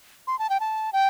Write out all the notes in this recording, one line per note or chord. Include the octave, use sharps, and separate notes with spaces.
C6
A5
G5
A5
G5